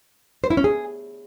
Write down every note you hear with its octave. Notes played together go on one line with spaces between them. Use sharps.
C5
E4
C#4
G#4